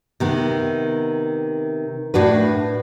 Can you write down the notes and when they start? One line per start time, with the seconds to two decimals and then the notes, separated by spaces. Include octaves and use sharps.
0.20 C3 D#3 B3
2.14 A2 D4 F#4 B4